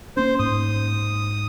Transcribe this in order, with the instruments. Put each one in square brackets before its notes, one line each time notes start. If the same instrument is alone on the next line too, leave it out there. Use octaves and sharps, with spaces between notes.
[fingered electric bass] A#3 C#4 [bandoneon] C5
[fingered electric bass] G#2 [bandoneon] D#6